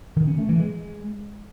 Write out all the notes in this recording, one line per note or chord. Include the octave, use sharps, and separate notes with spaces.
D#3
C#4
A3
E3
G#3